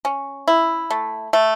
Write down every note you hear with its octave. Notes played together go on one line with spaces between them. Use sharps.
C#4
E4
A3
A3